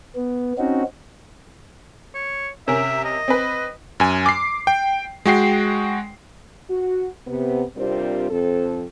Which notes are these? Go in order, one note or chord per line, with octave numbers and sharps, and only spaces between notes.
B3
C4 C#4 D#4 F#4
C#5
C3 C#4 A#4 E5
D#5
C4 B4
F#2 G#5
D6 C7
G5
G#3 F#4 G5 C7
F#4
C3 B3
C3 G3 C4 D4 F4 A#4
F2 C4 A4